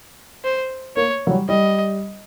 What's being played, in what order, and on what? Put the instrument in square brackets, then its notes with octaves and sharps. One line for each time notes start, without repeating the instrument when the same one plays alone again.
[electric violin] C5
[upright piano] A#3 [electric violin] C#5
[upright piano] F#3
G3
[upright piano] G3 [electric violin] D#5